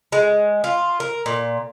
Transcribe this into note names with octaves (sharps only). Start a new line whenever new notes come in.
G#3
F4
A#4
A#2